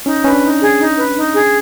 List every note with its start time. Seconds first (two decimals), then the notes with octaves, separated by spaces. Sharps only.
0.06 C#4 D#4
0.24 C#4 B4
0.33 D4
0.42 D#4
0.61 G#4
0.79 D#4
0.97 B4
1.16 D#4
1.34 G#4